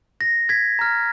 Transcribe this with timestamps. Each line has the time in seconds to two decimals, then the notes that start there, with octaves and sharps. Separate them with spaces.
0.21 A#6
0.49 G#6 B6
0.79 A#5 F6